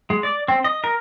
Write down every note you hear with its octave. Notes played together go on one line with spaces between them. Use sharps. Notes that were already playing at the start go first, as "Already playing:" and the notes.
G#3
D5
C4
D#5
A#4